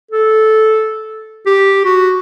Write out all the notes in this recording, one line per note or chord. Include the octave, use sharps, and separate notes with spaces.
A4
G4
F#4